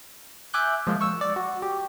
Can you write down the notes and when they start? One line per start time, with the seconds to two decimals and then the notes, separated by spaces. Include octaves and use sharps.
0.53 E5 G#5 D6 F#6 G6
0.87 F3 G#3 A#3
1.01 C#6 E6
1.21 D5
1.36 F#4
1.62 G4